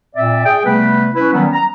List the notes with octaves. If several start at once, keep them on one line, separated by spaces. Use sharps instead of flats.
A#2 C4 D5 E5
G#4 G5
C3 G3 A3 B3 B4
C#4 E4 B4
D#3 F#3 G3 B3 C#4
A#5